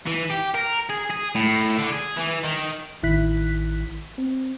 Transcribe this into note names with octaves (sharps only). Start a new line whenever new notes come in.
E3
G4
A#4
G#4
G#4
A2
D3
G#4
E3
D#3
A1 D#3 E4 F#6 B6
C4